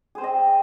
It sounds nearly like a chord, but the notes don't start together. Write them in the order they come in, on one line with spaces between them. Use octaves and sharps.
G#4 C5 C4 D#5